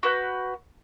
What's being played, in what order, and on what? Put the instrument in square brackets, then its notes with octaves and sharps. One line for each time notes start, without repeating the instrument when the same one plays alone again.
[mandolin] F#4 B4 G6